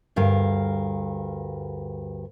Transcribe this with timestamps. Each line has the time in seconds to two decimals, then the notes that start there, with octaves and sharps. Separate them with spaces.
0.16 D2 G2 A#4 F5